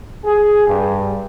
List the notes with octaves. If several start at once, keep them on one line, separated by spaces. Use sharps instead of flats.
G#4
G2